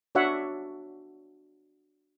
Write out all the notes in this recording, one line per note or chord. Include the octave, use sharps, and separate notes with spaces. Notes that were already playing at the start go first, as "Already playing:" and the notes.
D4 F#4 C#5 E5 F#5